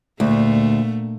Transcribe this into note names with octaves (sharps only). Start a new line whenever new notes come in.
D2 A#2 A3